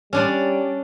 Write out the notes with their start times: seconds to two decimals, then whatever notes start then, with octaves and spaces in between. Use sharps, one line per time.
0.13 G3 C#4 D4 D5